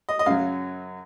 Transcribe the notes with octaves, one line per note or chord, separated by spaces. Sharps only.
D#5
D#5
F#2 C#3 F#3 F5